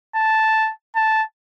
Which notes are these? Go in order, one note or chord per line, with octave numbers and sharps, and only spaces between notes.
A5
A5